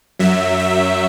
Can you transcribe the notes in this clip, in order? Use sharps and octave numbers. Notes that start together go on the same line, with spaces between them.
F#2 F#3 E5
E5